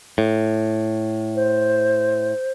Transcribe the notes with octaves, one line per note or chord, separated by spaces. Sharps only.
A2
C5